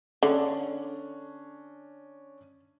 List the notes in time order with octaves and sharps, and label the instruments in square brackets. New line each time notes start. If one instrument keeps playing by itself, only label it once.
[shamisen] D3 [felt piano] C#4 D4